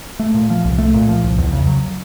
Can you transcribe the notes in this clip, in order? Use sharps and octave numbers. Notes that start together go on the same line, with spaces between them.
A3
A#2
F3
C2
A3
A#2
F3
C2
E2
C#3
F#3